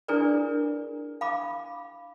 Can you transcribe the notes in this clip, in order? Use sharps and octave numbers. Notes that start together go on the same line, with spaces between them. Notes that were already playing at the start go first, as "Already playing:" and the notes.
D4 E4 G#4 A#4 B4 D5
F5 B5 D6